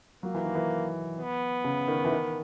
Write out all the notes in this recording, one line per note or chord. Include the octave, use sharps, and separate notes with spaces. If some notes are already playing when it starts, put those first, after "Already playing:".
F#3 A#3
E3
D#3
E3
B3
C#3
D#3
E3
D#3